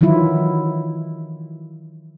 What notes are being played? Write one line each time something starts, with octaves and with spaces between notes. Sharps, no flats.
D#3 E3 F#3 E4 F4